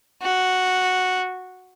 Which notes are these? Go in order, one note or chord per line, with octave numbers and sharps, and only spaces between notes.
F#4